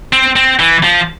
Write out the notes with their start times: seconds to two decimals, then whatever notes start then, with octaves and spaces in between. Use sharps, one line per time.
0.13 C4
0.36 C4
0.60 E3
0.83 F3